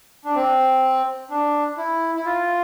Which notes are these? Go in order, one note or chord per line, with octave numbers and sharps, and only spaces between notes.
D4
C4
D4
E4
E4
F4